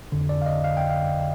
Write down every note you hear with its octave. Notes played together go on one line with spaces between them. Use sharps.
F2 D3
D5
F5
D#5
F5
G5
F5